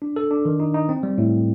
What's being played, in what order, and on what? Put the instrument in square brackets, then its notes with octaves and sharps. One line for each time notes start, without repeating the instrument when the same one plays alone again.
[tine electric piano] D4
A4
D4
D#3
D#4
D#4
C4
G3
A2